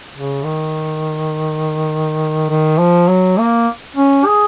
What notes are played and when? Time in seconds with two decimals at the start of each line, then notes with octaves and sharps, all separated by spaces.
0.15 C#3
0.44 D#3
2.50 D#3
2.79 F3
3.08 F#3
3.37 A#3
3.96 C#4
4.26 G#4